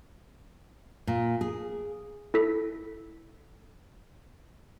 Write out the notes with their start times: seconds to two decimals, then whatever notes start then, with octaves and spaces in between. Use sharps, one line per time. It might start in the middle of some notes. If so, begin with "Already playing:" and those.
1.07 A#2
1.41 G#4
2.34 E4 A4 B6